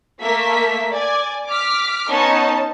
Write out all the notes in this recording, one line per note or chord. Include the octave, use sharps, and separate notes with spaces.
A3 A#3 A#4 E5 B6
D5 G#5
D6 F6 B6
B3 C#4 D#4 A5